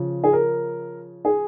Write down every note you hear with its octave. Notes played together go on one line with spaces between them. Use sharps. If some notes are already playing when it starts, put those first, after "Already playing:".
Already playing: C#3 F3
G#4
A#4
G#4